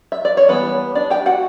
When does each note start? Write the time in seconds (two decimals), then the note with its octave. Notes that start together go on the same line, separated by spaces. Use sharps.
0.12 E5
0.25 D5
0.37 C#5
0.48 E3 G3 A#3 B3 B4
0.95 D4 D5
1.10 G4 G5
1.26 F#4 F#5